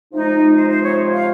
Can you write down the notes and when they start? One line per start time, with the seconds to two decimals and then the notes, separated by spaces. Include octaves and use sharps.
0.13 C3 F3 G#3 D#4
0.55 C5
0.70 C5
0.84 C#5
1.13 F5